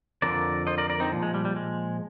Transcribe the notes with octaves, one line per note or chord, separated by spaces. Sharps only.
F2 D3 F3 A#4 D5
C5 D#5
A#4 D5
A#4 D5
C4 D#4
A#2 F3
G#3
G3
G3
G#3